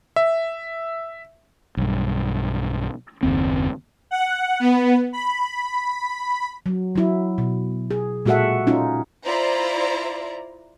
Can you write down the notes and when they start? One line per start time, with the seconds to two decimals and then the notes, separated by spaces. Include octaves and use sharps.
0.16 E5
1.77 B1 G2
3.23 F#1 D#2 C4
4.11 F#5
4.60 B3
5.13 B5
6.66 F#3
6.96 F#3 E4
7.38 B2
7.91 G#4
8.26 A#2 G#3 F#4 A4 E5 F#5
8.67 C#4 D#4 F4
9.25 E4 F4 C5 D5 A#5